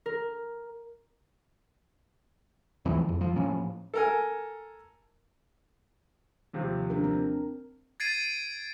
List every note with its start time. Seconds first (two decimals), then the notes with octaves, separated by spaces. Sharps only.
0.06 A#4
2.85 D2 E3 F3 C4
3.09 F2
3.21 F3
3.36 A2 F3 A#3 C#4
3.94 A4 A#4 G#5
6.53 D#2 C3 F3
6.90 D4 A#4
7.04 C4
8.00 G#6 A6 C7 D7 D#7